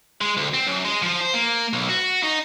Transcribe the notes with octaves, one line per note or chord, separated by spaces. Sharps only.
G#3
D2
C4
F#2
G#3
F3
C5
A#3
B1
F#4
D#4